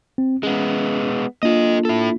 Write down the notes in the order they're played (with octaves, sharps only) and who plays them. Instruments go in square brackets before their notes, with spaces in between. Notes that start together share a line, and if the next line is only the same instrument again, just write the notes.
[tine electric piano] C4
[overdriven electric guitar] G#3 B3 [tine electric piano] C#4
[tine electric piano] A#3 D4 F4 [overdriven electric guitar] A4 D#5
[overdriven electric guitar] E4 A4